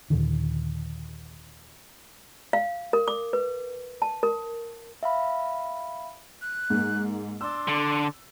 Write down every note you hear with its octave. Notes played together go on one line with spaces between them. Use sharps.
D#2 A#2 D3 D#3
F5
A#4
D6
B4
A5
A#4
E5 F5 B5
F#6
G#2 A#3
D4 C6 E6
D3